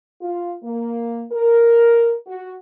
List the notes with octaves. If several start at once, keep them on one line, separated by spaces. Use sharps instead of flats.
F4
A#3
A#4
F#4